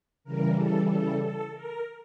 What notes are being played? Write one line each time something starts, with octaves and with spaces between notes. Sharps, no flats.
C#3 E3 G3 A#4
A4
A4
A4
A#4